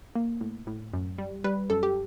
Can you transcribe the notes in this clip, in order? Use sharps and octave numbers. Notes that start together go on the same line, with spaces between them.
A#3
A2
A2
F#2
G3
G3 B4
F#2 A4
G4